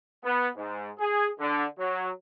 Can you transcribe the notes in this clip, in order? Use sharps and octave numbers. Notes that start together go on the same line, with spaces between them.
B3
G#2
G#4
D3
F#3